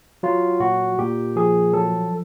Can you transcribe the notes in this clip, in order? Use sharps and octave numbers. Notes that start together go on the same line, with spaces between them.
F#3 F4
A#2 F#4
A#2 G4
F3 G#4
F#3 A4